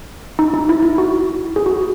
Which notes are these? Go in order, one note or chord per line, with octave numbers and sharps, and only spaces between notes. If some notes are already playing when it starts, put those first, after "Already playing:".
D#4
D#4
E4
E4
F#4
G#4
F#4